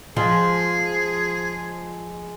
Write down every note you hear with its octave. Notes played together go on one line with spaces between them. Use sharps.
F3 G#3 G#4